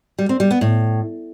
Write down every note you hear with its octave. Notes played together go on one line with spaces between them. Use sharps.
G3
C4
G3
B3
A2